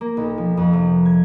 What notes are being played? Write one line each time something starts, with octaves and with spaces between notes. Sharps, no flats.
A#3
B1
F3
F2
C3
G#6